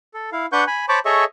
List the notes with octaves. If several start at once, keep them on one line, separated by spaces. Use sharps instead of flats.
A4
E4 F5
D4 B4 F#5 C#6 G6
G#5 B5
C5 C#5 A5 B5 C#6 D6
G#4 A4 C#5 D#5 E5 C#6